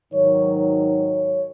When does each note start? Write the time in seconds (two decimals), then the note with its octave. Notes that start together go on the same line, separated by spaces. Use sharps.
0.12 G#2 D#3 F#3 C#5
0.77 C#5